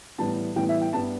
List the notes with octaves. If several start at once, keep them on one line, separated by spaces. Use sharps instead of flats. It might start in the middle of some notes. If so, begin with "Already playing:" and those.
A2 E3 G3 B3 A5
A2 E3 G3 B3 G5
E5
G5
G2 G3 B3 A5